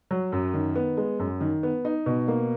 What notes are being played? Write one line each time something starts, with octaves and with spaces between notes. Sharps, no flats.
F#3
F#2
D#3
B3
G#3
F#2
D#3
B3
D#4
B2
A#3